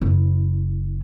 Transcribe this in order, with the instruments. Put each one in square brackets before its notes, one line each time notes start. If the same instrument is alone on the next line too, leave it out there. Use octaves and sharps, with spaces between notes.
[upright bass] F#1 E4